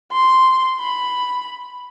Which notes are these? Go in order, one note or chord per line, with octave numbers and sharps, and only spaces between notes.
C6
B5